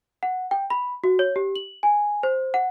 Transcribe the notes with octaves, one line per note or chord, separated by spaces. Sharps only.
F#5
G5
B5
F#4
C#5
G4
F#7
G#5
C5
F#5